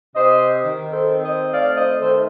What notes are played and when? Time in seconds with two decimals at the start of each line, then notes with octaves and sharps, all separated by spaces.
0.15 C3 C5 D#5
0.62 D#3
0.92 A4 C5
1.08 C4
1.23 C5 D#5
1.53 A3 D5 F5
1.76 C5 D#5
1.99 D#3 A4 C5